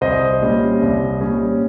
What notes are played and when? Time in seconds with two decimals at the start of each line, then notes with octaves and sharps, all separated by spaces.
0.01 C2 C5 D#5
0.42 A#2 G3 C#4
0.81 C2
1.20 A#2 G3 C#4